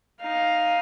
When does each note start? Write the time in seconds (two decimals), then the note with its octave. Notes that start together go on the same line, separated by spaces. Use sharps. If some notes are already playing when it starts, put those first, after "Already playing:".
0.20 D#4 F5